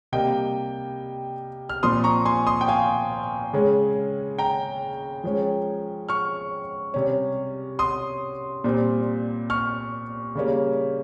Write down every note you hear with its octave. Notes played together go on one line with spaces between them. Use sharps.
C3 G3 A#3 D#5 G5
F6
A#2 F3 C4 C6 D#6
A#5 C#6
G#5 C6
C6 D#6
G5
F5 G#5
C#3 G#3 C#4
G5 A#5
F3 G#3 C#4
C#6 F6
C3 G3 C#4
C6 D#6
A#2 G3 C4
C#6 F6
C#3 G3 A#3 C#4